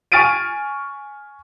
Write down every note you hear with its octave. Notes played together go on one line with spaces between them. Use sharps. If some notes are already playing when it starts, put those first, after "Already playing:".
G#5 C#6 F6 A6 D7 D#7